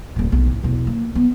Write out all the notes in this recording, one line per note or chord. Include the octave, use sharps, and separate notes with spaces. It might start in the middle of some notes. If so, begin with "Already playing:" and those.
D#1 A#2
B1
A1
E2 B2
A#3
B3